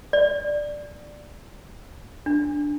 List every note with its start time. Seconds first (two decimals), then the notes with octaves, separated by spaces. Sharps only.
0.13 D5
2.26 D4